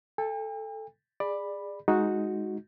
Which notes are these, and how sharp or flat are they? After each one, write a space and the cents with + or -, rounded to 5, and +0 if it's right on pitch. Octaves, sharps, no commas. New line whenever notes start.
A4 +0 G5 +45
G#4 -20 D5 +15 B5 +0
G#3 +0 D#4 +5 F#4 -5